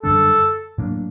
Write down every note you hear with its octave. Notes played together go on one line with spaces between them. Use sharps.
F#2 D3 G3 D4 A4
A2 F#3 A#3 D4